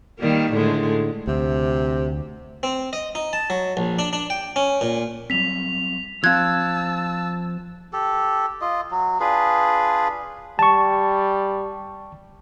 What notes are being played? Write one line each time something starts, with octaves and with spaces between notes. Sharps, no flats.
D#3 G3 A#3
A2 D3 G#3
D2 C3
C4
D#5
D#4
A5
F#3
A#1
D4
D4
G5
C#4
A#2
F#3 G3 C4 B6 F7
F3 C4 F5 A5 E6 F#6 G#6
G4 A4
F4 D#5
F#3
D4 F4 G#4 B4
G3 A5 C#6